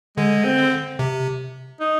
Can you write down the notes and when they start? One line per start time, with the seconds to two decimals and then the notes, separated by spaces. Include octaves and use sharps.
0.17 D3 G#3
0.44 C4
0.99 C3
1.80 D#4